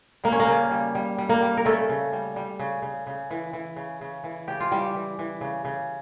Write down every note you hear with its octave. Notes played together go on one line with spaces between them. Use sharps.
G3 A#3
C#4
A#3
C#3
G3
G3
G3
A#3
G3
A#4
C#3 A3 A4
C#3
G3
G3
C#3
C#3
C#3
E3
E3
C#3
C#3
E3
C#3 G4
F4
E3 G3 G4
E3
E3
C#3
C#3